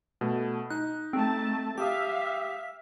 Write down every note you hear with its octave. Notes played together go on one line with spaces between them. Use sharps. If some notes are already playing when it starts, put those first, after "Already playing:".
B2 A3
D#4 F#6
A3 C4 A5
G4 E5 F5 D#6 B6